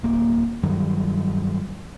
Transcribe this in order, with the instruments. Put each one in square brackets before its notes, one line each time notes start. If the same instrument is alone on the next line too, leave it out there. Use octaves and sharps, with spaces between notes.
[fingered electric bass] D1 A#3
G2 D#3 F#3 G3